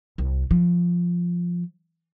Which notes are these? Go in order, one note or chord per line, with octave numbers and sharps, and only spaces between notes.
C2
F3